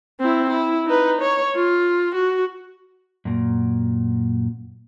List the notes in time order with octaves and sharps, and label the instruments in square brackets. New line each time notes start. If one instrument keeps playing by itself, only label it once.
[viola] C4 E4
E4
D#4 B4
C#5
F4
F#4
[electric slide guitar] F#2 A#2